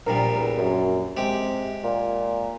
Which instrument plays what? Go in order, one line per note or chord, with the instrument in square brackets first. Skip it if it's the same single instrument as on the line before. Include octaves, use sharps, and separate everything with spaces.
[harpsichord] A#1 A#2 G3 [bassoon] A#4
[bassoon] E2
F#2
[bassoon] C3 [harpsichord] G#3 G4
[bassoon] A#2